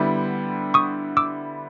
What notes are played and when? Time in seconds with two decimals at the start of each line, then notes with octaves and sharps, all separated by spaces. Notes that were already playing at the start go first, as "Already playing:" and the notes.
Already playing: D3 G3 B3 E4
0.74 C#6 D#6
1.17 D6 E6